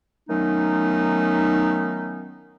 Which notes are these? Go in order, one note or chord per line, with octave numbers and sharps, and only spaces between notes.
D#3 F#3 A3 B3 C#4 D#4